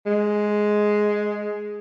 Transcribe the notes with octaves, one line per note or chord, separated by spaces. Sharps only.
G#3